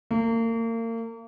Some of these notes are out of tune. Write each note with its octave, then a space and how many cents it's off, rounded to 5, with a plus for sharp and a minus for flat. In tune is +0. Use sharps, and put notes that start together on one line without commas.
A#3 -35